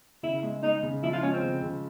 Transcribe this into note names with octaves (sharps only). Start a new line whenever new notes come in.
C#3 E4
G#3
G#3 D#4
C#3
F3 E4
F4
G#3 C#4
C4
C#3
C#3